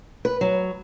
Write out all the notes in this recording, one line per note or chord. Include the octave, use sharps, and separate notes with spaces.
B4
F#3